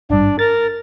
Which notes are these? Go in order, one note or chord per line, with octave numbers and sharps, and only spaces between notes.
G#1 G2 D4
A#4 A6